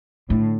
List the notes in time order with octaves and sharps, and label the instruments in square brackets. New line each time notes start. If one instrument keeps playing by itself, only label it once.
[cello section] A2 [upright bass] D3